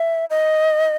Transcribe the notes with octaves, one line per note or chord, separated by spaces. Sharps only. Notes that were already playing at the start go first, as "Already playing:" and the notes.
Already playing: E5
D#5